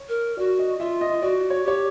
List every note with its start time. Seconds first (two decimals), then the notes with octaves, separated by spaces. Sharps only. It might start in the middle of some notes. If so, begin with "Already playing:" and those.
Already playing: C#5
0.09 A#4
0.38 F#4 D5
0.59 D#5
0.79 F4 E5
1.01 D#5
1.22 F#4 D5
1.50 C#5
1.64 G4 C#5